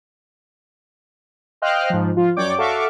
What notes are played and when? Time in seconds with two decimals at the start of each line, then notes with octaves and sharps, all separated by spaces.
1.62 C5 D#5 F5 G5 F6 F#6
1.90 G#2 F3
2.17 F3 F4
2.37 F#2 C#5 D5 G5 D6
2.58 F#4 A4 E5 F5 C#6 D6